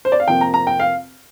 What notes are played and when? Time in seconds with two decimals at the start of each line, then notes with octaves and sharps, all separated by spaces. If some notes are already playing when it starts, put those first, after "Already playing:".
0.05 C5
0.12 D5
0.20 F5
0.28 F2 C3 F3 A#3 G5
0.41 A#5
0.54 A#5
0.67 G5
0.80 F5